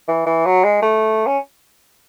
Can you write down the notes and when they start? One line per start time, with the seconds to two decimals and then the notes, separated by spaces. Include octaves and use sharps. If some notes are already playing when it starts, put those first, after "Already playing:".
0.08 E3
0.26 E3
0.46 F#3
0.64 G#3
0.82 A3
1.27 C#4